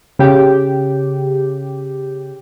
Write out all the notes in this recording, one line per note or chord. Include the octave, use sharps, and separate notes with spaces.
C#3 G4